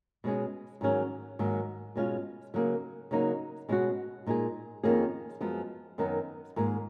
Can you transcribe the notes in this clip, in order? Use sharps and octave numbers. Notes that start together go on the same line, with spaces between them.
B2 G#3 C#4 G#4
G#2 D#3 F#3 C#4 G#4
G#2 D#3 F#3 A#3
B2 G#3 C#4 F4
C#3 F#3 A#3 D#4 G#4
C#3 F#3 A#3 D#4
B2 G#3 C#4 F#4
A#2 G#3 D#4 G#4
F2 D#3 A#3 C#4 G#4
F#2 F3 G#3 B3
F#2 D#3 F#3 B3 D#4
G#2 D#3 A#3 F4 G#4